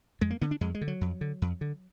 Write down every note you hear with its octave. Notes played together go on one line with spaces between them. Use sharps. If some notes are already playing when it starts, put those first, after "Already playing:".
F2 G#3
A#3
D3 B3
D4
F2 G#3
G#3
D3
F#3
F2
D3
F2
D3